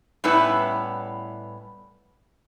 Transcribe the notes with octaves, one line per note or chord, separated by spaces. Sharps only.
A2 G3 B3 C#4 E4 B4